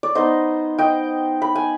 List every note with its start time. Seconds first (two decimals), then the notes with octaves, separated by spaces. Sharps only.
0.03 D5
0.15 B3 D#4 C5 D#5
0.78 D#5 G5
1.42 B5
1.55 G#5